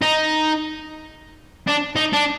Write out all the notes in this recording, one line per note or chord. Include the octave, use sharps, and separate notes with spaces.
D#4
D4
D#4
D4